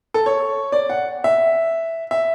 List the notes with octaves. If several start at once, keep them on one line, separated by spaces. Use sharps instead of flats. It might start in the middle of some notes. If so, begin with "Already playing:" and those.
A4
C#5
D5
F#5
E5
E5